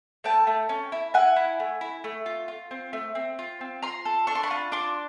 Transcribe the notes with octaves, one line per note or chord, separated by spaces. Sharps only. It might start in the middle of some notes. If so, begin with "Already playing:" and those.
A3 G5 A5
A3
C#4
E4
E4 F#5 G#5
E4
A3
E4
A3
F4
F4
C4
A3
C4
F4
C4
F4 A#5 C6
A4
D4 C#6
C6
B5 C#6
F4
D4 C6 D6